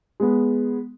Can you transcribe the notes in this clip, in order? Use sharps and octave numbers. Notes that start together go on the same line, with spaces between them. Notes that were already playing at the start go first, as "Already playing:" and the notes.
G#3 B3